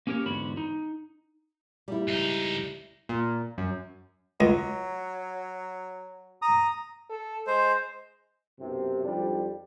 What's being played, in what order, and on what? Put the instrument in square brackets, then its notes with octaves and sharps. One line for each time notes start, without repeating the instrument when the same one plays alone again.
[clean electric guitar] A#3 C#4 G4 A#4 C#5
E2 G#2 D3 F#4 B5
D#4
[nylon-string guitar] G3 E4
[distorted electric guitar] C#2 D#4
[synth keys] A#2
F#2
[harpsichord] C#2 [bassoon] F#3
[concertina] A#5 D#6
[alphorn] A4
[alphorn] G#3 [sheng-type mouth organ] C5
[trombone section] B1 F#2 C3
G#1 F2 G3 D4